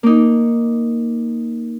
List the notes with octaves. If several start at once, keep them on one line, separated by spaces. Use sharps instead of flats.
A#3 D#4